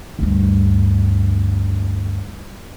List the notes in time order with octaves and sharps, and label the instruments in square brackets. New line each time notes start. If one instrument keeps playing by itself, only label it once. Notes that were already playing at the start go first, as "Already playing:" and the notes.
[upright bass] D2 G2